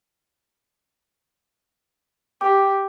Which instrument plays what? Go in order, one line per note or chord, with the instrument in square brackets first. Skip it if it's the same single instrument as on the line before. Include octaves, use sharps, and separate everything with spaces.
[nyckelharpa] G4 [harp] G5 [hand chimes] D6